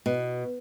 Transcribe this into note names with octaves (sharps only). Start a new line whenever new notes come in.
B2